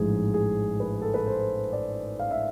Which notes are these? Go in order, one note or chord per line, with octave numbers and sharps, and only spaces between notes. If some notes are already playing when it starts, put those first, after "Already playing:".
Already playing: A1 G#2 F3 G#3 G#4
G#4
B4
A4
B4
C5
D5
F5
E5